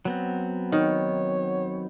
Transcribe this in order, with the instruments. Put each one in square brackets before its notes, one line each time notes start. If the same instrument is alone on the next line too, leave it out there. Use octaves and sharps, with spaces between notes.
[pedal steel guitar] F#3 B3 C4
[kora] D#3 [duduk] C#5